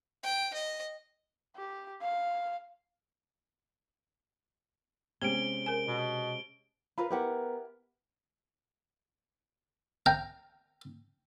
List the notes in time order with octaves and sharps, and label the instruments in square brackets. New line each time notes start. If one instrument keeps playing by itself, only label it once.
[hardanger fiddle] G5
D#5
[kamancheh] G4
F5
[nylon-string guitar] C3 G#3 C#4 [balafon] B3 G4 G5 [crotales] D7 G7
[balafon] A#4 G#5
[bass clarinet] B2
[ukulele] F4 A#4 B4 [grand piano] B5
[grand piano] B3 A#4 [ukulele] E4 G4 F#5
[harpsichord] F5 G5 A#5